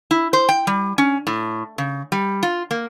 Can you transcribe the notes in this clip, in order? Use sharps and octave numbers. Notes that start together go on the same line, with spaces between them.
E4
C5
G5
G3
C#4
A2
C#3
G3
F4
A#3